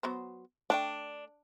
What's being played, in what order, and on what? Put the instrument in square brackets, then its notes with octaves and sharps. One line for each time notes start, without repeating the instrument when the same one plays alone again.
[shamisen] F#3 B3 C5
[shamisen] A3 C#5 G5 [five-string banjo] D4